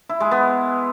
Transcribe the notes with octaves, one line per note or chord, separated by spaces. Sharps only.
E4
G#3
B3